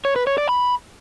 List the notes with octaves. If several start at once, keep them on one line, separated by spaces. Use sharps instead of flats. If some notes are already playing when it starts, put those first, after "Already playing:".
C#5
B4
C#5
D5
B5